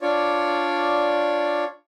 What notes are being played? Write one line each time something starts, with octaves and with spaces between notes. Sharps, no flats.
D4 F4 C#5 D5